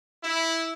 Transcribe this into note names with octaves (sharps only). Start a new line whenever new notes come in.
E4